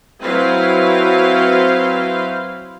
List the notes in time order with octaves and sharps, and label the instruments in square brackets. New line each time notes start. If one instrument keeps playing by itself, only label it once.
[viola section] F#3 C4 E4 B4 C5 F5